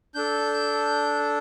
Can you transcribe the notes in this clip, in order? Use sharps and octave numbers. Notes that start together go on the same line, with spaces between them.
D4 A4 G6